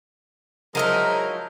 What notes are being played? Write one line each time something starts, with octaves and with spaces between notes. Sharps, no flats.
F3 F#3 G#3 D#4 E4 A#4